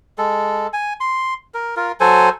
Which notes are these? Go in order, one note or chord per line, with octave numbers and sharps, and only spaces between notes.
G#3 A4
G#5
C6
A#4
F4 A#4
F#3 A4 C5 G#5